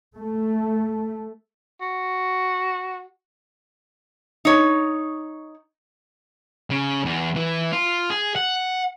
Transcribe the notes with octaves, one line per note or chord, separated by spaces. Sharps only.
A3
F#4
D#4 C#5
C#3
E2
E3
F4
G#4
F#5